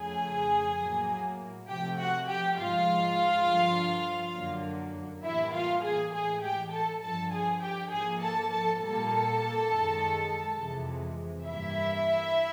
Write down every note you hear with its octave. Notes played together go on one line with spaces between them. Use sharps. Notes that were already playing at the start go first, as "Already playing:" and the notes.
Already playing: F2 C#3 F3 A3 G#4 G#5
A2 F#3 A#3
C3 F3 A3 G4 G5
F#4 F#5
G4 G5
G#2 F3 G#3 F4 F5
G2 D3 F3
F#2 D3 F#3 A#3
A2 E3 G3 A#3 E4 E5
F4 F5
G#4 G#5
A2 E3 G#3 G#4 G#5
G4 G5
A4 A5
G2 D3 F3 A4 A5
G#4 G#5
G4 G5
G#2 F3 A#3 G#4 G#5
A4 A5
A4 A5
A#2 G3 A#3 A4 A5
F#2 D#3 G#3
F2 C3 E3 G#3
G2 E3 G3 A#3 E4 E5